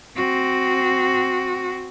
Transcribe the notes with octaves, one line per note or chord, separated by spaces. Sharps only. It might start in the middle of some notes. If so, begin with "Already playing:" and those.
C4 F#4